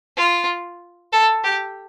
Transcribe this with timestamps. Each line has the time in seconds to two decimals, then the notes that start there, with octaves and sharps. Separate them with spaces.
0.17 F4
1.13 A4
1.44 G4